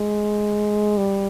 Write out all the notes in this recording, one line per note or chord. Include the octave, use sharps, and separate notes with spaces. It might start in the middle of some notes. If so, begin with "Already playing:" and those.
Already playing: G#3
G3